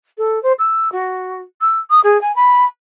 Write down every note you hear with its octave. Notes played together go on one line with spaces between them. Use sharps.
A4
C5
E6
F#4
E6
D#6
G#4
G#5
B5